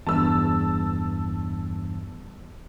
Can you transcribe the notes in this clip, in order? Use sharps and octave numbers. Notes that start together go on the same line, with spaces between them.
E2 G2 A5 E6